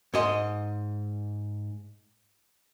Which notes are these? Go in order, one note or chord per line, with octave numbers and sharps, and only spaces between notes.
G#2 D#5 C6